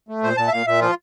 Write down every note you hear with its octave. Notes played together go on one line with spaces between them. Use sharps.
A3
A#2 C5
A#2 A5
E5
A#2 F5
A#2 E5
F3 F4